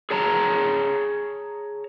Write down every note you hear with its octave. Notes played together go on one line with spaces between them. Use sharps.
G#4 C#5 A5 A#5